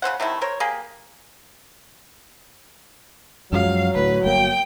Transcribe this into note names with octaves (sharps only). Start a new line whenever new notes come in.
C#3 C#4 C5 F#5
C3 D#3 A3 E4
A#4 C5 C#5
A#3 G4 G#4
F#2 F3 F#3 G#3 F5
D2 A2 B4
G1 A#3 G5